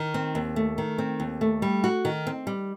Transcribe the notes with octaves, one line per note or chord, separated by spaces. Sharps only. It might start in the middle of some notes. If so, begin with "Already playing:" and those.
Already playing: D#3
C4
D#2
A3
D#3
C4
D#2
A3
G3
F#4
D#3
C4
G3